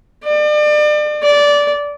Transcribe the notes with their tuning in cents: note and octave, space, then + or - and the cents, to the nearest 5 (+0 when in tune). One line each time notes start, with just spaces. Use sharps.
D5 +35
D5 -15